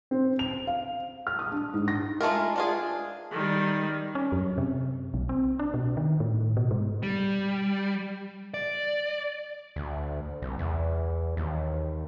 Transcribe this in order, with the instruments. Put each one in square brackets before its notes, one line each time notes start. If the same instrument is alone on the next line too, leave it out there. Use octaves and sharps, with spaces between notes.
[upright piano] C4
F7
F5
[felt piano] F6
D#6
D4
G#2
A#6
[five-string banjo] G#3 A3 F4 A#4
D4 F4 G#4
[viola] D#3 G3
[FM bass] C#4
F#2
C3
B1
C4
D4
B2
D#3
A2
B2
G#2
[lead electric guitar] G3
D5
[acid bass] D2
C2
E2
D#2